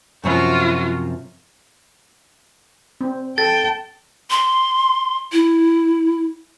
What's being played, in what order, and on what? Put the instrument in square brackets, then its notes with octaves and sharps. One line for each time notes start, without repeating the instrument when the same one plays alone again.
[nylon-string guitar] F#2 C3 F3 [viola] F4 F#4
[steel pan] C4
[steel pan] A4 [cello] G5 [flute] A5 [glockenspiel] A6
[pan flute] C6
E4